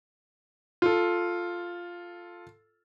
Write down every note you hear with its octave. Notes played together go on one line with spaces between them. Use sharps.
F4 A4